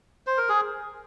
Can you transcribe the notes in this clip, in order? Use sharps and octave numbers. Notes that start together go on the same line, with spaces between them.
C5
A#4
G#4